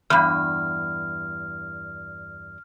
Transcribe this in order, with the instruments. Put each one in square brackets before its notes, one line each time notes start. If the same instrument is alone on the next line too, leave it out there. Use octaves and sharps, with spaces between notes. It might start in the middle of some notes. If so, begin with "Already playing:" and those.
[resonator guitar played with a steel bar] E2 G2 [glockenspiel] F6